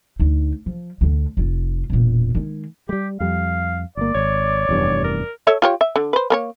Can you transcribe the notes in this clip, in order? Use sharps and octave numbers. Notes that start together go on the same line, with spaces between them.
D2 D#4
F3
D2 D3
F1 F4
E1 A#2
D#3 G#3
G3 G#3 G4
F2 G3 F5
G1 A#3 D5
G#1 C#5
F1 E2 G2
A#4
A4 C#5 E5
F4 G4 C#5
E5
D3
B4 C5
A#3 A#4 C#5